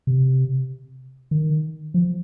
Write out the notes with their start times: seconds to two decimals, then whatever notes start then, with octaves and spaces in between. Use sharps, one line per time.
0.07 C3
1.31 D#3
1.94 F3